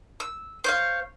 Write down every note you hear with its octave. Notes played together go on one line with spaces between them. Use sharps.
E6
C5 C#5 F5